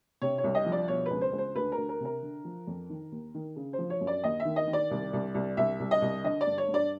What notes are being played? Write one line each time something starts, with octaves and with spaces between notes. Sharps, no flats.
C3 C#5
C#5
C2
D#5
F3
D5
B2 C#5
C#2 B4
C5
C#2
C5
D2 B4
A#4
D2
A#4
C3 A#4
D3
F3
F2
D#3
D#2
D#3
C#3
C5
F3
C#5
F#2
D5
D#2 D#5
E5
D#3
D#5
D#3
D5
C2
C2
C2
C2 E5
C2
D#5
C2
D3 D#5
D5
G2
C#5
G2
D5